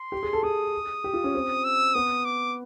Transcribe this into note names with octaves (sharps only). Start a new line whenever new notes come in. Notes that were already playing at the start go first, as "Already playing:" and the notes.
Already playing: C6
G4
G#4
A4
G#4 D#6
G4
F4
C#4
C4
E6
B3 D#6
D6